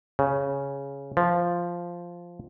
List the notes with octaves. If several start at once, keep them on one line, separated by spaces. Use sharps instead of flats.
C#3
F3